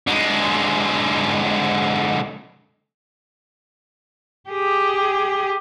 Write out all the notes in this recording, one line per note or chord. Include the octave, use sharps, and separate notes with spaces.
D3 G#3
G4 G#4